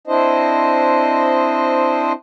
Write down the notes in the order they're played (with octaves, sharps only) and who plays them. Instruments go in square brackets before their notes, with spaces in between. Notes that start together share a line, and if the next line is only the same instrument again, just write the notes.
[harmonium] C4 D4 E4 C5 D#5